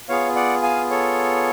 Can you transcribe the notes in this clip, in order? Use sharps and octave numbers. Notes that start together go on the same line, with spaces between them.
B3 F4 G#4 C#5 F5
D5 F#5
F5 G#5
A4 C#5